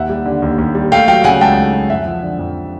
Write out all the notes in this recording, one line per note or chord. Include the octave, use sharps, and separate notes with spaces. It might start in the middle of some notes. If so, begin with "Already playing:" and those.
Already playing: D#2 E5 F#5
G3
D3
D#2
D#2
G3
A3 F5 G5
F#3 F5 G5
C#3 F#5 G#5
C#2 G5 A5
A3
F#3
F2 E5 F#5
F3
D3
F2